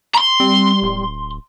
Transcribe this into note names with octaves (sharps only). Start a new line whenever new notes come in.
A#5 C6
G3 C4
D1